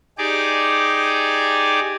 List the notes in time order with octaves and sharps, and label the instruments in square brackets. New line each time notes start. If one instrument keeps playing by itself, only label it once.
[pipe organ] D#4 G4 G#4 D5 D6